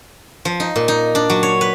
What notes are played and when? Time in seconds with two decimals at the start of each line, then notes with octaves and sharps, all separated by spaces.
0.45 F3
0.60 D#4
0.76 A#2
0.88 D#4
1.15 D4
1.30 F#3
1.43 C#5
1.61 B4